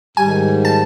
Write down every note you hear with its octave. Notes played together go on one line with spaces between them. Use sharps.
G#2 D#3 G3 G#5
A5